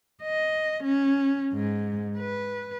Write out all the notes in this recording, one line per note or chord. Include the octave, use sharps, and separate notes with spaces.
D#5
C#4
G#2
B4